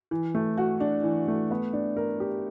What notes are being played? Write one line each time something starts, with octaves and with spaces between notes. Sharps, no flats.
E3
A3
F#4
D4
E3
A3
B3
D4
A#4
G4